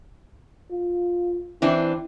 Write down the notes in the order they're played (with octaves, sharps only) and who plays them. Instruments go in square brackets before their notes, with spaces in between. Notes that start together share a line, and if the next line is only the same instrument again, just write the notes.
[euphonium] F4
[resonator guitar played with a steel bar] E3 C4 D4 [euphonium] E4